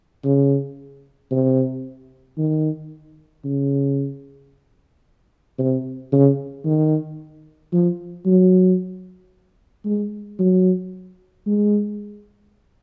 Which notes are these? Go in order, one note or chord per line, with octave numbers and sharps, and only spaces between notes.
C#3
C3
D#3
C#3
C3
C#3
D#3
F3
F#3
G#3
F#3
G#3